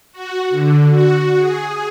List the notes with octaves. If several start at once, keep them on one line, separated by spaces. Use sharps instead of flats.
F#4
D3
F#4
G#4